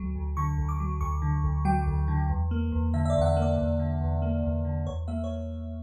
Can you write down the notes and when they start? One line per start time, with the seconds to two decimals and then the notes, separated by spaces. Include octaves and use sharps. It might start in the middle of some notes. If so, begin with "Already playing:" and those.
Already playing: D2 F#3
0.15 D2
0.37 D3 C#6
0.58 D2
0.69 D6
0.80 F#3
1.01 D2 C#6
1.22 D3
1.44 D2
1.65 F#3 G5
1.86 D2
2.08 D3
2.29 E2
2.51 A#3
2.72 E2
2.94 D3 E5
3.05 E5
3.10 D5
3.15 E2
3.21 F#5
3.26 E5
3.37 A#3
3.42 D5
3.58 E2
3.80 D3
4.01 E2
4.22 A#3
4.43 E2
4.65 D3
4.87 E2 C#5
5.08 A#3 E5
5.24 C#5